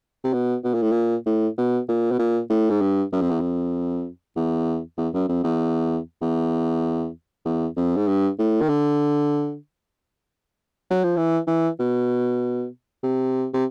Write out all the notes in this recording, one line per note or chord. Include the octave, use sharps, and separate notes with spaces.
C3
B2
B2
A#2
A2
A#2
A2
B2
A#2
B2
A#2
A2
G#2
G2
F#2
F2
E2
F2
E2
E2
F#2
F2
E2
E2
E2
F2
G#2
G2
A2
D#3
D3
F#3
F3
E3
E3
B2
C3
C3